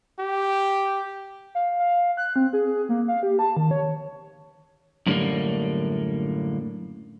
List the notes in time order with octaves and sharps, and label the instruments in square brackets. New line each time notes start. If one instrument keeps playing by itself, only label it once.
[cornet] G4
[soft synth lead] F5
F5
F#6
C4
G#4
A#3
F5
G4
A5
D#3
C#5
[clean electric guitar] F#2 A2 D3 F3 G3 A#3